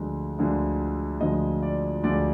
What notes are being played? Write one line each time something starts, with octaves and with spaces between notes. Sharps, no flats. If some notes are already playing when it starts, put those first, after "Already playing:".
Already playing: D2 D3 F3 G#3
D2 D3 F3 G#3
D2 D3 F3 G#3 D#5
D5
D2 D3 F3 G#3 D5